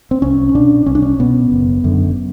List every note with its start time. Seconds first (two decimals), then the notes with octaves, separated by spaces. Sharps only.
0.11 C4
0.22 C2 C#4
0.54 B2 D4
0.86 C2 C#4
0.95 D4
1.02 C#4
1.19 B2 B3
1.52 F#1
1.84 F#2 D3